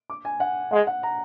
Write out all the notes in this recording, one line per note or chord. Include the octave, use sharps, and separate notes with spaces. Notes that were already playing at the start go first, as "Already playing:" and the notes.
D6
G#5
F#5
G#3 F#5
F#5
A#5